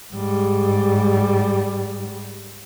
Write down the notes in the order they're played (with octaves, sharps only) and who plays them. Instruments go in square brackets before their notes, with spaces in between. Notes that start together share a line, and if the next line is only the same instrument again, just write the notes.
[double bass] G#2 G3